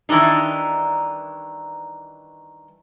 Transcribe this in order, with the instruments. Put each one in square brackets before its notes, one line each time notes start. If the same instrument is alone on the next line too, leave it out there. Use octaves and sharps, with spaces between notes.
[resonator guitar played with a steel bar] D#3 E3 G3 D4 D#4